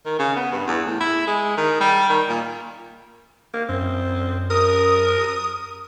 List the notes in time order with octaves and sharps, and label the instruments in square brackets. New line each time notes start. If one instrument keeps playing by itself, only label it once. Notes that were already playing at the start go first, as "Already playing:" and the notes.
[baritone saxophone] D#3
C#3
B3
G2
E2
A2
E4
G#3
D#3
G3
D#3
A#2
[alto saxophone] A#3
[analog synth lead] F#2 [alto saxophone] C4
[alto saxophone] A#4 [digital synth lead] D#6